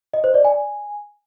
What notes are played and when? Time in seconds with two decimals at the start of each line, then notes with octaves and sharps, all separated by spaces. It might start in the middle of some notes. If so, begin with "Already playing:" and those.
0.14 D#5
0.24 C5
0.34 D5
0.45 G#5